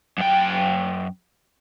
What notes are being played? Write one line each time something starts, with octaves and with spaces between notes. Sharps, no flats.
F#2 G5